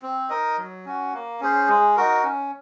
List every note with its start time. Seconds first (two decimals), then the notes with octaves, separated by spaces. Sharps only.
0.02 C4
0.30 D#4 A#4 D#5
0.58 F#3
0.85 C#4 F#4
1.13 A#3
1.40 C#4 G#4 C5
1.68 G#3
1.97 D#4 F#4 A#4
2.23 C#4